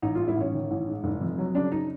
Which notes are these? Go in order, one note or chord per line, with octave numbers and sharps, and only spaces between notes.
A1 D#4
F4
G#2
E4
A1 C#4
D#3
A1
G#2
F1
F2
F#3
C#3 D4
D#4